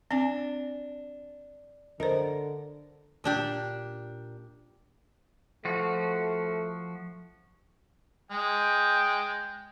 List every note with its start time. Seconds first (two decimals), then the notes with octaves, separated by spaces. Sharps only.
0.11 C4 D4 G#5
2.00 D3 A#4 C5 D#5
3.24 A#2 D4 G4
5.65 F3 A3 F#4
8.31 G#3 G5